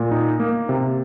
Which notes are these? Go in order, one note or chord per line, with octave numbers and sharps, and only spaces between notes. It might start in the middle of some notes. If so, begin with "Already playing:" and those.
Already playing: A#2
D#4
A#3
C3